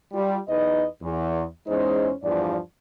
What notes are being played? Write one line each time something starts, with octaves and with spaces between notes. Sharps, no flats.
G3 F4
E2 D#4 B4 D#5
E2
E2 G#3 C#4 D#4 C5
E2 G2 F3 D5